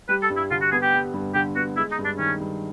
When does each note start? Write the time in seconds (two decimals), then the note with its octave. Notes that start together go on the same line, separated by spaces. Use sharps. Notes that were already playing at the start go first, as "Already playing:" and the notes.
0.09 G3 B4
0.23 A4
0.30 G2
0.37 E4
0.51 D3 F4
0.61 F#4
0.72 B3 G#4
0.82 G4
0.94 G3
1.14 G2
1.35 D3 G4
1.56 B3 F#4
1.77 G#3 E4
1.92 D#4
1.99 G2
2.05 D4
2.19 D#3 C#4
2.40 G2